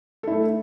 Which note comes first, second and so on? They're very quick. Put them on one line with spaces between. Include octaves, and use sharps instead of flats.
A4 E4 A3